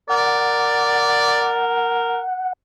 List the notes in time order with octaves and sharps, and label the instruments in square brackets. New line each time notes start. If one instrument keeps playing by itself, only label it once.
[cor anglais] A#4 [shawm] D5 [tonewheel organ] F#5